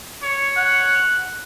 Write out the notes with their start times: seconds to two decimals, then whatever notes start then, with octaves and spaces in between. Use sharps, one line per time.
0.23 C#5
0.56 F#5